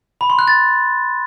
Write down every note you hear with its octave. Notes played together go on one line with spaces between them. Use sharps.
B5
C6
F#6
A6